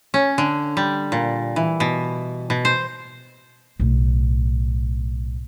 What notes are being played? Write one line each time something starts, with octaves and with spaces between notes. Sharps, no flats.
C#4
D3
G3
A#2
E3
B2
B2
C5
B1 A2